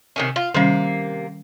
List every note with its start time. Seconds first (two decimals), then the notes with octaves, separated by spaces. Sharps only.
0.16 C3 D#3 C#4
0.36 F4
0.54 C3 D#3 G3 A#3 C#4